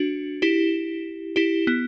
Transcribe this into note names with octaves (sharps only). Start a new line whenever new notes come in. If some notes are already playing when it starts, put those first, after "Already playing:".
Already playing: D4 F#4
E4 G4
E4 G4
B3